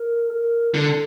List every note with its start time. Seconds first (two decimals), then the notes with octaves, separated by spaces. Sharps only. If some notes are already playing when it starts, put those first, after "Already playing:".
Already playing: A#4
0.30 A4
0.33 A#4
0.74 D3 A4